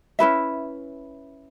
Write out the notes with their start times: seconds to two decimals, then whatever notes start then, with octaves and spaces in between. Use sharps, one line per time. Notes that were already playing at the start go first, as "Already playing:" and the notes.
0.19 C#4 E4 B4 E5